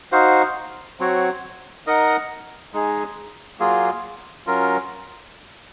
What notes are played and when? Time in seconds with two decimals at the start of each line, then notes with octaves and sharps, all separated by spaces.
0.12 D#4 F#4 C5 F5
1.00 F#3 C4 F#4 C#5
1.87 D#4 A#4 D#5 F#5
2.74 G#3 D#4 G#4
3.60 F#3 A#3 F4 G#4
4.47 F#3 C#4 F4 A#4